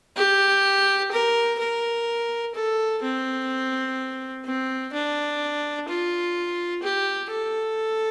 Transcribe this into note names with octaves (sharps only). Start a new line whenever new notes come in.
G4
A#4
A#4
A4
C4
C4
D4
F4
G4
A4